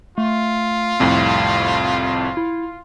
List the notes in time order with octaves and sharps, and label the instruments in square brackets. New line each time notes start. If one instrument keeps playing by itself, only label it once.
[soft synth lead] A3 [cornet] F4
[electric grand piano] C2 F2 A2 [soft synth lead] C4
[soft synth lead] E4